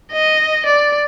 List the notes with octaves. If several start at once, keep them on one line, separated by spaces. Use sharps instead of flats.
D#5
D5